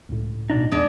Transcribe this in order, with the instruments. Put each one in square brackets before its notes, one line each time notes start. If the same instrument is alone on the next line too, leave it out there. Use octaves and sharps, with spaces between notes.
[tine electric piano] C#2 A2
[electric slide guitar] B2 D4 D#4
[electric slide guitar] E2 [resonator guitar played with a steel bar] G#3 D4 D5